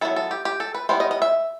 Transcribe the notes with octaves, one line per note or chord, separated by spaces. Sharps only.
F#3 B3 E4 A4
A4
G4
G4
A4
B4
G3 B3 E4 C5
D#5
D#5
E5